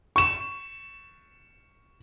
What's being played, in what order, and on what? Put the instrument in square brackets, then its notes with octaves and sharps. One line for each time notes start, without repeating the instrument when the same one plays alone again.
[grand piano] C#6 E7